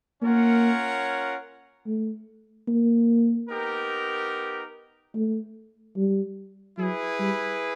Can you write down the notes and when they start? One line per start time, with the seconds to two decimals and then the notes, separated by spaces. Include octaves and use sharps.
0.22 A#3 C#4 F4 A#4 C#5 F#5
1.86 A3
2.68 A#3
3.50 B3 D#4 G4 A#4
5.15 A3
5.97 G3
6.78 F#3 E4 G#4 B4
7.20 G3